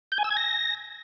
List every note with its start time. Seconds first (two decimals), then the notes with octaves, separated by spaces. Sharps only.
0.12 G6
0.18 G#5
0.24 E6
0.31 G#6
0.37 A#6